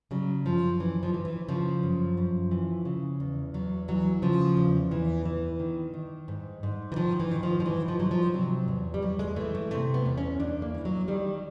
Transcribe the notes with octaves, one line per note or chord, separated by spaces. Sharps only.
C#3 F#3
F#2 F3
F#2 E3
F3
E3
E3
C#3 F3
F#2
F#2
E3
C#3
E2
E2 F#3
E3 F#3
C#3 F3
E2
E2 E3
E3
D#3
D#3
G#2
G#2
E3
D#3 F3
E3
D#3
F3
F3
G#2 E3
F3
G#2 F#3
F3
C3 F#3
E2
G3
E2 F#3
G#3
E3 A3
A3
C3 A3
B3
E2
C#4
E2 D4
A#3
E3
F#3
D#3 G3